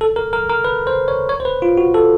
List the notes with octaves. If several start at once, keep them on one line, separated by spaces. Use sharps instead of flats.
A4
A#4
A#4
A#4
B4
C5
C#5
C#5
C5
B4
F4
F#4
A4